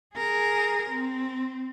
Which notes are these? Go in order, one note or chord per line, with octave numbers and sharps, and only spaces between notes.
G#4 A#4
C4